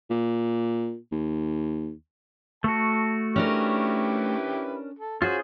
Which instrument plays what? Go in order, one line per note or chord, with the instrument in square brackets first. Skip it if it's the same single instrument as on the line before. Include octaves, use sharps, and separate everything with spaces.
[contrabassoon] A#2
D#2
[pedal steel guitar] A3 F#4 [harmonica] A5
[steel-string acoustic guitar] C#4 D4 A#4 [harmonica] E4 G4 B4
[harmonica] A4
[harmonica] C#4 [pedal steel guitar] F4 G#4 C5 [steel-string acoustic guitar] F#4